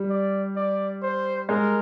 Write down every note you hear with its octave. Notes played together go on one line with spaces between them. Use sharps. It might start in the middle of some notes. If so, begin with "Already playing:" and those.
Already playing: G3
D5
D5
C5
G#3 A#4